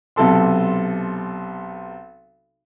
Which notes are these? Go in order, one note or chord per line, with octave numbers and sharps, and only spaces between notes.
B1 C3 A4 C6